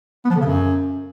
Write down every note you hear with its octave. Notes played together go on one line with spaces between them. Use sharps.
B3
F3
D3
C#3
F#2